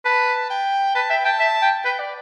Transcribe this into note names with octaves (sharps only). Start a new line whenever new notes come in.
B4 A5
G5
B4 A5
E5 G5
G5 A5
E5
G5
B4 G5
D5